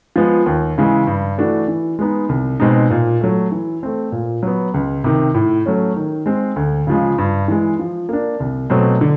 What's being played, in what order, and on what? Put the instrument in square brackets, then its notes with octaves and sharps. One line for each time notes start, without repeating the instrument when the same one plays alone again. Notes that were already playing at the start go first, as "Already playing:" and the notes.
[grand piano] F3 G#3 B3
D#2
C#3 E3 G#3
G2
E3 A3 D4 F#4
E3
G#3 B3 D#4
C2
B2 G#3 C4 D#4
A#2
F#3 A3
E3
A3 C4
A#2
F#3 B3
C#2
C3 D#3
A2
F#3 A3 C#4
D#3
G#3 C4
D2
C#3 F3 G#3
G2
E3 G#3
F3
A#3 D4
C2
B2 F#3 A3 C4
D3